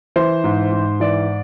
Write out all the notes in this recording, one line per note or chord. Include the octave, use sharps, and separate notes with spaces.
E3 C5
G#2
G#2
E3 D5